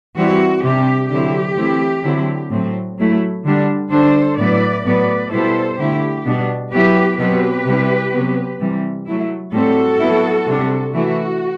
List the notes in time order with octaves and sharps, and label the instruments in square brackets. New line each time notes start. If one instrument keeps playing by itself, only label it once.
[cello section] E3 G3 C4 E4 F#4
C3 G3 D4 G4
D3 F#3 C4 E4 G4
E3 A3 C4 E4
D3 F#3 C4 E4
A2 F#3 C4
F#3 A3 E4
D3 G3 D4
D3 G3 D4 A4 C5
A2 F#3 B3 E4 B4 D5
A2 F#3 B3 B4 D5
B2 G3 B3 E4 A4 C5
D3 A3 E4 G4
B2 G3 B3 D4
F#3 B3 E4 G4 B4
B2 F#3 C4 G4 B4
C3 G3 C4 E4
C3 F#3 B3
C3 E3 G3
F#3 A3 E4
A2 G3 C4 F#4 A4
F#3 B3 E4
C3 G3 D4
E3 A3 E4 F#4